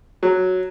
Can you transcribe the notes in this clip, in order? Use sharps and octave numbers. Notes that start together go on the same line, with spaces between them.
F#3